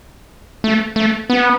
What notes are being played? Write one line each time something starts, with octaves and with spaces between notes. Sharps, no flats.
A3
A3
B3